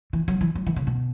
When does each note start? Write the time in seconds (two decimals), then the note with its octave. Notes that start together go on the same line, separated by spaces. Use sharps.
0.13 E3
0.28 F#3
0.41 E3
0.55 F#3
0.67 E3
0.76 C#3
0.87 B2